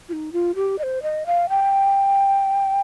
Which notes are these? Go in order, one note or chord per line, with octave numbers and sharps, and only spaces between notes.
F4
D#4
F4
G4
D#5
C5
D#5
F5
G5